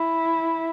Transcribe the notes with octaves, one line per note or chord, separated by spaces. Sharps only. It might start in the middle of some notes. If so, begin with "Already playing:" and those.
Already playing: E4